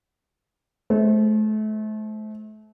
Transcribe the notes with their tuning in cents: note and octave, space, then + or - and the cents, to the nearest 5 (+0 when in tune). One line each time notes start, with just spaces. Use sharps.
A3 -35 C5 +0